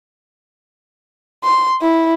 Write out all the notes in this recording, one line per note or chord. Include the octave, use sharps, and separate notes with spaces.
C6
E4